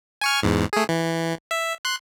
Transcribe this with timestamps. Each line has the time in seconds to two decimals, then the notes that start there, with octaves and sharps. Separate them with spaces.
0.21 G#5 C#6 F6
0.43 E2 G#2
0.73 A3 G#4
0.89 E3
1.51 E5
1.85 C6 F#6